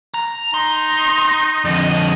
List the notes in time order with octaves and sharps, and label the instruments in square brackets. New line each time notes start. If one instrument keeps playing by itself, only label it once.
[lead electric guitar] A#5
[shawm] D#4 [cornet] A#5 [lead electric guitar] C6
[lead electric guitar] F2 D3 [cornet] D#5